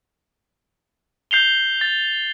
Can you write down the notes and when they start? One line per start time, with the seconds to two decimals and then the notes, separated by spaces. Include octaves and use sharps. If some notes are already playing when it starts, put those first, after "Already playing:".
1.31 G6 C7 F7 G7
1.81 A6